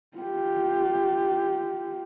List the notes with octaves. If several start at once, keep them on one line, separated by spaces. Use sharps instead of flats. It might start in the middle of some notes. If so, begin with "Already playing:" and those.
F4 G4